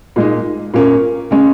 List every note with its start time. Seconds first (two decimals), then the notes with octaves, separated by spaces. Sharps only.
0.16 A#2 G#3 D#4
0.74 A#2 A#3 C#4 A#4
1.31 C#3 G#3 C#4